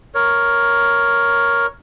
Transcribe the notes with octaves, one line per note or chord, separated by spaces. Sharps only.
A#4 C#5